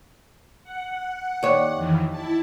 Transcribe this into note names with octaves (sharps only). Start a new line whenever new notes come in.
F#5
D#2 C#5
F2 D#3 E3
E4 A5